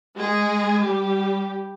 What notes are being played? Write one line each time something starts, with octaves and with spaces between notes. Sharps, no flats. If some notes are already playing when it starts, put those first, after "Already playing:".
G#3 G#4
G3 G4